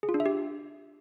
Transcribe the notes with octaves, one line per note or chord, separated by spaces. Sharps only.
G#4
F4
D4
E5
G4